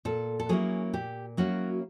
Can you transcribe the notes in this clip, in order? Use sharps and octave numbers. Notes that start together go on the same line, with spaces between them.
A#2 A4
A4
F#3 A#3 C#4 E4 G#4
A#2 G4
F#3 A#3 C#4 E4 F#4